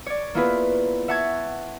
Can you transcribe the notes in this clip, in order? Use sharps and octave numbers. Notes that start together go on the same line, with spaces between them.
C#5 D5
A#3 B3 E4 F4 G#4 B4
E5 F#5 A5 C#6 G#6